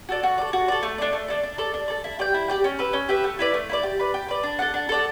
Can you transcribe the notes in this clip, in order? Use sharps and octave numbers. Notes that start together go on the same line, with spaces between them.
F#4 A4 D5
F#4
A4 D5
F#4
A4 D5
A3
D4 A4 D5
A3
D4 A4 D5
D4
A4 D5
D4
A4 D5
E4
G4 D5 G5
E4
G4 D5 G5
C#4
G4 B4 E5
C#4
G4 B4 E5
A3
E4 B4 D5
A3
E4 B4 D5
G4
B4 D5
G4
B4 D5
D4
A4 D5 F#5
D4
A4 D5 F#5